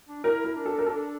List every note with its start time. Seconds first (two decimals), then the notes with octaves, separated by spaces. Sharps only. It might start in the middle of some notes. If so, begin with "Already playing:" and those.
0.08 D4
0.24 E4 A#4
0.44 A#4
0.56 D4
0.66 A4
0.79 A#4
0.86 D4 A4